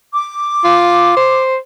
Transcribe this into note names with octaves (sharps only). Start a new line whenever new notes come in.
D6
F4
C5